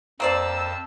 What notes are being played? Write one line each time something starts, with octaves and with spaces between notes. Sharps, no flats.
F2 A#3 C5 D5 A5 E6